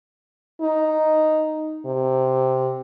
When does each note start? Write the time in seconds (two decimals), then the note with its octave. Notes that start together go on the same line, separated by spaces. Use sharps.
0.62 D#4
1.86 C3